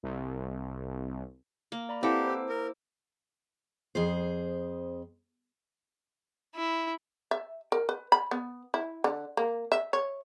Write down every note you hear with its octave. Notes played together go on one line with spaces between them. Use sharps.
C2
A#3
D5 A#5 B5
C4 E4 G4 A4 B4 F5 F#5
C5 D6 E6
A#4
F2 G#4 C5
E4
E5
A#4
B4
B5
B3
E4
D3
A#3
E5
C#5